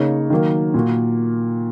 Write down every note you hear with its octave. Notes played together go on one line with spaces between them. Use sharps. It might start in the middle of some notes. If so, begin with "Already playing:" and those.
Already playing: C#3 A#3 D#4 A#4 C#5
D#3 F#3 A#3
A#2 A#3 F#4